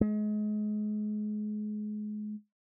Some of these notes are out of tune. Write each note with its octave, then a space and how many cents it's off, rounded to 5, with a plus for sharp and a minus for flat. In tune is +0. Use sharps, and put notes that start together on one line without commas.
G#3 +30